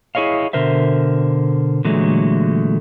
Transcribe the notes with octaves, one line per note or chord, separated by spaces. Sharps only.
E4 G#4 C#5 D#5 F5
B2 D3 A#4 C5 E5
A#2 D3 E3 F#3 G#3 A3